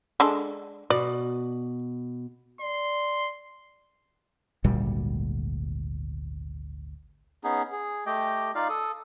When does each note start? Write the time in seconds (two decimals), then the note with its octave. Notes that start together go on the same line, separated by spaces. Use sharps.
0.20 G#3 D4 A4
0.90 B2 D5
2.61 D5 C6
4.64 G#1 D2 A#2 G3
7.44 B3 C#4 D#4 G#4
7.72 G#4
8.06 A3 G4 D#5 G5
8.55 D#4 F4 D5 F5
8.69 A4 D#6